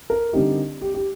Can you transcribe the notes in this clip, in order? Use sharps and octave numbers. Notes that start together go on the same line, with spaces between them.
A#4
D3 G3 C4 D#4 G4
G4
G4